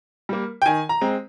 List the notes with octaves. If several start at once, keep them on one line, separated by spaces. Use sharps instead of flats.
G3 A#3
G5
D#3 G#5
A#5
G#3 C4